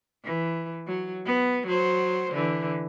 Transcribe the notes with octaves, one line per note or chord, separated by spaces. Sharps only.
E3
F#3
B3
F#3 C5
D3 E3